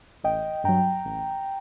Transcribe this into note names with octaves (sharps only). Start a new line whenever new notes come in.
A1 D#5 G5
G2 F#3 G5 A#5
A1